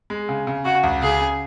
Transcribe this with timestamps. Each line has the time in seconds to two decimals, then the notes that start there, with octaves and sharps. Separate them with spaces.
0.10 G#3
0.29 C#3
0.47 C#3
0.65 C#3 F#4
0.83 C#2
1.02 C#3 G#4
1.20 C#3